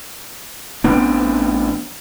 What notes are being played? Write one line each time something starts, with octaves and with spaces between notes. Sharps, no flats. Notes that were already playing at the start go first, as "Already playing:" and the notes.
A1 B3 C4 D4